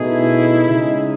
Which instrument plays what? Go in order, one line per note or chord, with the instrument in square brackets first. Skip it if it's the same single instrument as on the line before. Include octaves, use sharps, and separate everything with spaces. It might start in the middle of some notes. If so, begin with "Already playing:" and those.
Already playing: [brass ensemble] B2 A3 D#4 G#4
[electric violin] E4
[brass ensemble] C#3 G#3 D#4 G#4